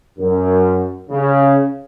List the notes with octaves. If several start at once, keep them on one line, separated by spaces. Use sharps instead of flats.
F#2
C#3